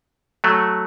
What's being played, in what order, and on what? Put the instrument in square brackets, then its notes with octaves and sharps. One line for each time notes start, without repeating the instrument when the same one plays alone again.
[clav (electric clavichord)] F#3 A3